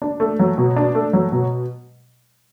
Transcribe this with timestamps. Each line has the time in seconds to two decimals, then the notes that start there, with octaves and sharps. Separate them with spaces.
0.02 D4
0.20 A3
0.40 F#3
0.58 B2
0.76 D4
0.95 A3
1.13 F#3
1.32 B2